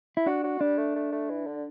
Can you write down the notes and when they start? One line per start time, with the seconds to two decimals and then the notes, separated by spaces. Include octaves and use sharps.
0.17 E4
0.26 D4 F#4
0.44 F#4
0.61 G3 D4
0.78 A3
0.96 A3
1.13 A3
1.30 E3
1.47 D3